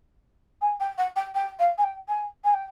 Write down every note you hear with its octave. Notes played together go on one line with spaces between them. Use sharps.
G#5
G5
F#5
G5
G5
F5
G#5
G5
G#5
G#5
G5